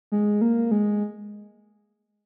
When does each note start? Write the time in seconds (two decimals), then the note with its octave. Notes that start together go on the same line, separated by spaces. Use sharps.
0.12 G#3
0.41 A#3
0.71 G#3